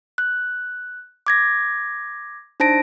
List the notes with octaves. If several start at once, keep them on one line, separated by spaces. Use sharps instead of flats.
F#6
D6 G#6 A#6
D4 D#4 C5 A5 A#6 D7